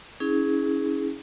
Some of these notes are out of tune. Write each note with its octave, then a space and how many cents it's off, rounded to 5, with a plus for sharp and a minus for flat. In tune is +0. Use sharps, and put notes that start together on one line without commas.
C#4 +0 E4 -40 G#4 +0